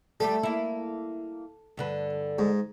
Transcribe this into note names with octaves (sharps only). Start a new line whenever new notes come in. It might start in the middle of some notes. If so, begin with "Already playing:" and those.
G3 A3 G4 A4
A#3 E4
G2 D3 B4
G#2